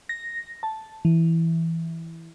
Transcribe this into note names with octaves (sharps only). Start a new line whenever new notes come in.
A#6
A5
E3